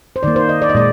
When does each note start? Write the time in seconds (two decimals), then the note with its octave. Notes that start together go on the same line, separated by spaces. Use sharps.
0.16 C5
0.23 D#3 A#3 D5
0.36 C5
0.49 D#5
0.62 D5
0.69 D#5
0.75 A#2 G#3 D5